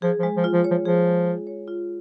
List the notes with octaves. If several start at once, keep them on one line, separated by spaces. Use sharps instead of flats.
F3 G#4
F3
G#3
F3
F4
F3
C#5
F3
F3 G#4
G#3
F4
C#5
F4